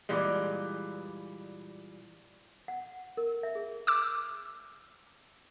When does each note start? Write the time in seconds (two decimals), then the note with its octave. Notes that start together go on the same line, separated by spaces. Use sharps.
0.09 A#2 E3 G3 G#3
2.68 F#5
3.17 A#4
3.43 E5
3.55 G#4
3.87 D6 E6